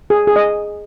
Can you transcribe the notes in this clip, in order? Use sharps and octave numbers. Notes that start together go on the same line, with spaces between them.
G#4
G#4
D#5